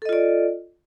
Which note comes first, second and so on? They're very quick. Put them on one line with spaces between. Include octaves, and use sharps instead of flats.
A4 D#5 F4 D5